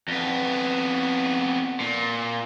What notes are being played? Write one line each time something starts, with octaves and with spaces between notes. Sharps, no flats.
F2 B3
A#2